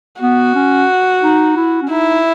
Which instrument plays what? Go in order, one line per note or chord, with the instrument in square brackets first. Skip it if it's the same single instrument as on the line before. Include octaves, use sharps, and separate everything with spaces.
[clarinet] B3 [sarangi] F#4
[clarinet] C#4
D#4
E4
C#4
[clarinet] D#4 [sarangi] E4